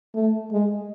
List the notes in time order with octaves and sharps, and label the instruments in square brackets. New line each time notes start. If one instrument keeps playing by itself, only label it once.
[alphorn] A3
G#3